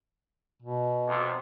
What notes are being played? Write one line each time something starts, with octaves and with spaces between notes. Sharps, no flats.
B2
B1 F2 C3